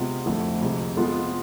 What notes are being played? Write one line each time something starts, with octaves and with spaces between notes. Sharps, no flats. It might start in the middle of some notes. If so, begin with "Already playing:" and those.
Already playing: C3 G#3 B3 F4 G#4
F2 D3 A3 E4
F2 C3 G#3
F3 G#3 B3 F4 A4